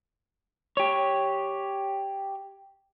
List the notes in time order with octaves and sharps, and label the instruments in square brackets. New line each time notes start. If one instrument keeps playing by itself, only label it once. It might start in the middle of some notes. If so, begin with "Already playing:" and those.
[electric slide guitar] G4 C#5